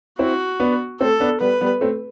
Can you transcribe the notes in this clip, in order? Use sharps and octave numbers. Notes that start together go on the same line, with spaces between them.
C4 E4 F#4
B3 D4
A3 C4 A4
B3 D4
G3 B3 B4
G3 B3
A3 C4